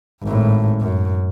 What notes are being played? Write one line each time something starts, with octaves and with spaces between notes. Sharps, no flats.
G#1 A2
F#2